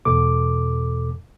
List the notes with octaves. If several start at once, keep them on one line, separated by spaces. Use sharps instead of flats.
E2 B2 A4 D6